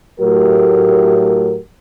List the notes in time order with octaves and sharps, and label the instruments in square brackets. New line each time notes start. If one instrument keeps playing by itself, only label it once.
[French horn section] A2 F#3 A3 G4 A#4